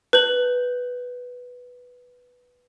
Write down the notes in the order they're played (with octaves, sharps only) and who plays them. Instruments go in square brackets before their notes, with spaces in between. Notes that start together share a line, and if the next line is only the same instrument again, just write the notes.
[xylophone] B4 G6 F#7